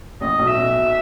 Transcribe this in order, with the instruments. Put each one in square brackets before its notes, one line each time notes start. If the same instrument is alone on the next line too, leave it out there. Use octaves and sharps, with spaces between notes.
[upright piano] A1 A2 [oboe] D#5
[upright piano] B1 B2
[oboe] E5
[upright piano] B1 B2